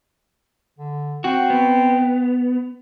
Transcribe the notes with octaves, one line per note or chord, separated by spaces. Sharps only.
D3
C4 F#4
B3